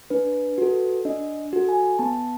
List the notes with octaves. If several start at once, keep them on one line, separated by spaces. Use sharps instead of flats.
D4 B4
F#4 A4
D4 D#5
F#4 A4
G#5
B3 A5